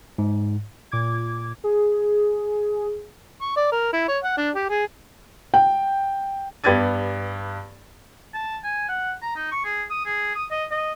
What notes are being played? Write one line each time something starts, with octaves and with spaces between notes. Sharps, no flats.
G#2
A#2 D6 G#6
G#4
C#6
D5
A#4
E4
C#5
F#5
D4
G4
G#4
G5
G2 B3 G4 G#6 A6 D#7
A5
G#5
F#5
A#5
D#4
C#6
G#4
D#6
G#4
D#6
D#5
D#5